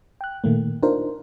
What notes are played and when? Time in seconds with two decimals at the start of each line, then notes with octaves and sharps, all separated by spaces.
0.21 G5 F#6
0.44 A#2 D#3 A3 A#3
0.83 D4 D#4 F4 A#4 C5